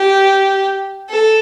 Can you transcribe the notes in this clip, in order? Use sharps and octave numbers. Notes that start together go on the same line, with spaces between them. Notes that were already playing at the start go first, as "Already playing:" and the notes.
Already playing: G4
A4